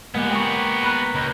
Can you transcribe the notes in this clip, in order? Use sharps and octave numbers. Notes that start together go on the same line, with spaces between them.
G#3 A#3 B3 G4 F#5
G5 A#5 C#6
A#5 B5 F#6
C#2